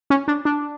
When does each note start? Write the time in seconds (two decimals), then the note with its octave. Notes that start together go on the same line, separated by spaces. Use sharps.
0.10 C#4
0.28 D4
0.45 D4